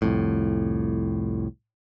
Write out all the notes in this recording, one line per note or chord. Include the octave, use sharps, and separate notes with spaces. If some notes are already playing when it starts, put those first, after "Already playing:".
C2 F2 A2